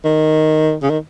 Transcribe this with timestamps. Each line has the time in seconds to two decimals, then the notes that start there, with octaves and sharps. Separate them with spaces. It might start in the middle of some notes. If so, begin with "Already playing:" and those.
0.04 D#3
0.83 C#3
0.90 D#3